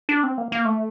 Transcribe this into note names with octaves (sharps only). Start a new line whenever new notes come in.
D4
C4
A#3
A#3
A3